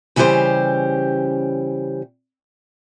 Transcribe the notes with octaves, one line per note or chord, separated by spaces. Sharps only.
C#3 E3 G3 C#4 G4 C5